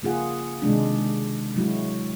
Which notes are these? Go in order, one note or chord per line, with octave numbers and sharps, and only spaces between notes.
C#3 A#3 F4 G#4 F#5
C3 D#3 G#3 D4
F#3 G#3 E4 F#4